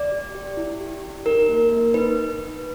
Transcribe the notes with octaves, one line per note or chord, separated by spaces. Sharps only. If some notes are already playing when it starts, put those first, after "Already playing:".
Already playing: D5
G4
G4
E4
G4
G4
D#4 A#4
A#3
A#3
D#4 B4